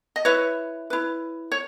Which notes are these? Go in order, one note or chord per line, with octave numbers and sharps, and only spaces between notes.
D#5
E4 B4 C#5 E5
E4 B4
C#5